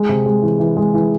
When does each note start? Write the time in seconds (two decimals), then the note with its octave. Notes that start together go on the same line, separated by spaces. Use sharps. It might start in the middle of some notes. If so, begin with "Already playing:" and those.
Already playing: G#3
0.09 C3
0.26 G#3
0.42 E3
0.60 E3
0.77 G#3
0.94 E3